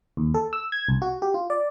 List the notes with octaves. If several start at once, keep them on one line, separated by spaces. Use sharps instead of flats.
D#2
A4
E6
G#6
C2
F#4
G4
F4
D5